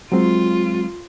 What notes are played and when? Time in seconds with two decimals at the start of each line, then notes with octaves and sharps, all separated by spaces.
0.12 F#3 G#3 C4 F4